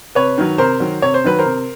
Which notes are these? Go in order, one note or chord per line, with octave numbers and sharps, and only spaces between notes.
C3 B4 C#5
D#3 F#3
C3 A#4 C5
D#3 F#3
C3 C#5
C5
D#3 F#3 B4
A#4 C5
C3